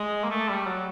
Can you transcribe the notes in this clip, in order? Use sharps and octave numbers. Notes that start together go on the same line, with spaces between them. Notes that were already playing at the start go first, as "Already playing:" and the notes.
Already playing: G#3
A#3
A3
G3
F#3